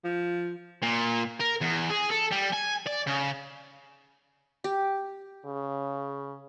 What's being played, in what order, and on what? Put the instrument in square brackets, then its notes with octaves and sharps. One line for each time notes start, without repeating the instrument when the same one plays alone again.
[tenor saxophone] F3
[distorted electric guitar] A#2
A#4
E2
G#4
A4
G3
G#5
D5
C#3
[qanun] G4
[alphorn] C#3